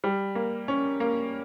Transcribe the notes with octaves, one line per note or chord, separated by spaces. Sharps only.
G3
A#3
C#4
A#3